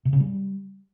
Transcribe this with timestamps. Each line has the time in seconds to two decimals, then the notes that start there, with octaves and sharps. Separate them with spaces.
0.05 C3
0.13 C#3
0.20 G3